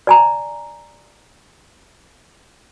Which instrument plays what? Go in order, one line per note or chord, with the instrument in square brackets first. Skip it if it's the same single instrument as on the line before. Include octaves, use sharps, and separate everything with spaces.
[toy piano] D5 G#5 A#5